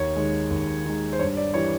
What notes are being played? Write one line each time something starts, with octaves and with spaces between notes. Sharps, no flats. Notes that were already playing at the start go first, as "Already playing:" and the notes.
Already playing: D#2 C#5
D#3 G#3
D#2
D#3 G#3
C5
G2 C#5
D5
E3 G3 C#5